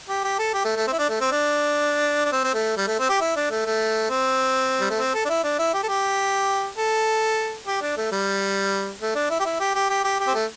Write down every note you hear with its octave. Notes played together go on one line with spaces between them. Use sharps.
G4
G4
A4
G4
A3
A3
C4
E4
D4
A3
C4
D4
D4
C4
C4
A3
G3
A3
C4
G4
E4
D4
A3
A3
C4
G3
A3
C4
A4
D4
E4
D4
E4
G4
A4
G4
A4
G4
D4
A3
G3
A3
D4
E4
G4
E4
G4
G4
G4
G4
G4
C4
A3